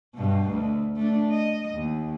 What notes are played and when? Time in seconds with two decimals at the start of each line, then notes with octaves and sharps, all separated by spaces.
0.15 G2 B2
0.51 D2
0.97 A3 D4
1.32 D#5
1.75 D#2